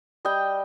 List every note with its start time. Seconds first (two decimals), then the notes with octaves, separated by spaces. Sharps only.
0.25 G3 D#5 G5